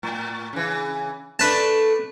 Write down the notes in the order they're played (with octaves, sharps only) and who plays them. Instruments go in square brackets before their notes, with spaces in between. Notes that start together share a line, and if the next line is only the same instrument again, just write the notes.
[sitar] A2
C#3 E3
[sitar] A3 D4 [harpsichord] B4 A5